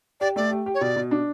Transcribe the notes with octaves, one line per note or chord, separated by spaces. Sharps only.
G4 D5
A3 D5
G4
G4
C#5
B2 D5
B2
D4